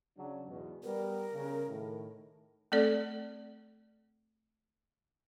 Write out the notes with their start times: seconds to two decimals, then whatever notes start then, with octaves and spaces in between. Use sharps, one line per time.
0.17 C#3 F#3 D4
0.47 E2 G#2 B2
0.83 G3 B3 A#4
1.33 C#3
1.67 A2 D#3
2.72 A3 C4 A4 D5